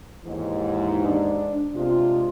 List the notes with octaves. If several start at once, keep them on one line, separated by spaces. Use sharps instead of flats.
D#2 G#2 E3
D4
C3 G#3 D4 F4